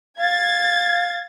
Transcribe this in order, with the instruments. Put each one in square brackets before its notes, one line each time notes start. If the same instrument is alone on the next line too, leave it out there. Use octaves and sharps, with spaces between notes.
[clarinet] F5 [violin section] G#6 A6